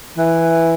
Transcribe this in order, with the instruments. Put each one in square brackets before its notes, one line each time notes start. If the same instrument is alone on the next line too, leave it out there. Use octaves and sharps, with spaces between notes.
[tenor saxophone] E3